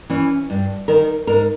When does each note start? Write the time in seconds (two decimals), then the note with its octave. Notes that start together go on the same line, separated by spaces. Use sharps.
0.10 E3 C#4
0.50 G2
0.88 D#3 A#4
1.27 G#2 A#4